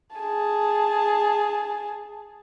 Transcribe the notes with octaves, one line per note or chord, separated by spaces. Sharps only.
G#4 A5